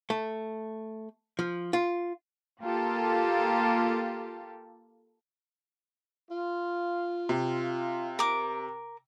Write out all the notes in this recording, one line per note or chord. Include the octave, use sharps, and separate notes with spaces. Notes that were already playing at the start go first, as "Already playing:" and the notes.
A3
F3
F4
A#3 F4 G4 A4
F4
C3
A#4 D6